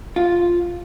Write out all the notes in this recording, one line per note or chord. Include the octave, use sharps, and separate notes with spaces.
F4